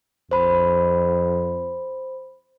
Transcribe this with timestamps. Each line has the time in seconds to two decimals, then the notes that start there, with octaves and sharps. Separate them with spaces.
0.31 F2 C5 B5